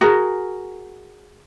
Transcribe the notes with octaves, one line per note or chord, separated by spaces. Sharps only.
F#4 G#4 A#4